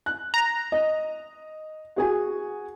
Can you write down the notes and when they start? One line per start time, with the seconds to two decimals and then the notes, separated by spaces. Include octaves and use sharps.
0.06 F#6
0.34 A#5
0.72 D#5
1.96 F#4 G#4 G#5